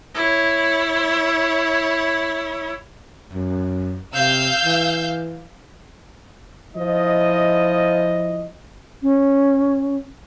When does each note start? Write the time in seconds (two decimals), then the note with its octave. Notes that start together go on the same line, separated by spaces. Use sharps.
0.15 E4 C#5
3.33 F#2
4.15 C3 F5 E6 G6
4.65 E3
6.76 F3 E4 D#5
9.02 C#4